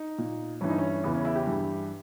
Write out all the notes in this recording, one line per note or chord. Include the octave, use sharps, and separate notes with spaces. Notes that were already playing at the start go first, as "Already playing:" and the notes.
Already playing: D#4
A#2
G2 E3 C#4
D#4
C#4
E2 C#3 E3 B3
C#4
E4
G4
G2 E3